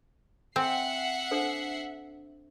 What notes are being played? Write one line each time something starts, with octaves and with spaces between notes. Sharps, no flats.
C4 E5 F#5 G#5 C7
D4 A4 C5